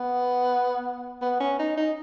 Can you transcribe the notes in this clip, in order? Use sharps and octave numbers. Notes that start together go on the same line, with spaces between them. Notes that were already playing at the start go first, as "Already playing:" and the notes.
Already playing: B3
B3
C#4
D#4
D#4